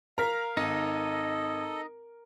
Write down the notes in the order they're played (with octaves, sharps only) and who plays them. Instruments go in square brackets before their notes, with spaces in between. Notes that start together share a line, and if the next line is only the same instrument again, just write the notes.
[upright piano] A#4 [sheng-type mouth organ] F5 [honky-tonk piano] A#5 F6 B6
[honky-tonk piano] G#1 [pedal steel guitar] D#4 [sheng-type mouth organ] A4 D#5